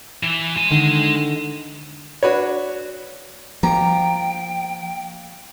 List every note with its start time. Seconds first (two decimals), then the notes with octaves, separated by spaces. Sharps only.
0.23 E3
0.57 G#3 G#5
0.71 D3 D#3
2.23 D4 F#4 B4 C#5
3.63 F3 A#3 G5 A#5